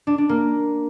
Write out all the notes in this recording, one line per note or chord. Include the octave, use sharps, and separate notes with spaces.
D4
D4
A#3